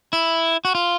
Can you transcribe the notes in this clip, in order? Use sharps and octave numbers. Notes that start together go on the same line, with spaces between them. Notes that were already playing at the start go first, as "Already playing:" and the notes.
E4
F#4
F4